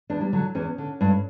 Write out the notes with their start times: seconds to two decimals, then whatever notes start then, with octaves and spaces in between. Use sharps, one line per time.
0.10 E2 D4
0.21 G3
0.33 D3 F#3
0.55 E2 C#4
0.78 D3
1.01 G2